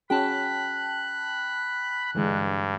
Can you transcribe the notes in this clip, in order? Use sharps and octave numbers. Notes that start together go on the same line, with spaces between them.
C#4 F#4 G#4 G5 A5 B5 F#6
G2 D3 E3 G#3